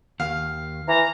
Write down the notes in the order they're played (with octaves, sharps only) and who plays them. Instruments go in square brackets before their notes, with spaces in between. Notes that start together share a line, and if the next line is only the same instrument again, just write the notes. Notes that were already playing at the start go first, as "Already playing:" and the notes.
[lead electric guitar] D#2 [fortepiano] F5
[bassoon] E3 [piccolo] A#5